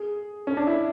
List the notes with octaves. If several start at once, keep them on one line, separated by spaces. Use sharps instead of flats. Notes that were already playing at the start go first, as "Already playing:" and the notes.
Already playing: G#4
C#4
D4
E4